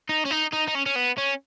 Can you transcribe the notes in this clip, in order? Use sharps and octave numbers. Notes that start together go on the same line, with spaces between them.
D#4
C#4
D#4
D#4
D#4
C#4
C#4
B3
C#4